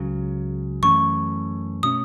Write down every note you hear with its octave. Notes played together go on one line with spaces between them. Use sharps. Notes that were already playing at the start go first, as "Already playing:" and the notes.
Already playing: C#2 C#3 F#3
F#2 E3 A3 C#4 C#6
B2 A3 C#4 D#6